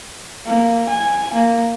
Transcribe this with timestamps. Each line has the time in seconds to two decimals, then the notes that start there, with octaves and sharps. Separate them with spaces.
0.47 A#3
0.89 G#5
1.34 A#3